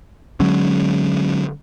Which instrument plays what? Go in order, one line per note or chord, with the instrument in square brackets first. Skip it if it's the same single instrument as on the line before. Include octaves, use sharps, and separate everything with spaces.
[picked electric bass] D3 F#3 G#3 C#4